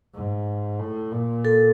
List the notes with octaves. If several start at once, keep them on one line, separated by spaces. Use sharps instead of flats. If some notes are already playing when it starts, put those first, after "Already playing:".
G#2
A2
A#2
A4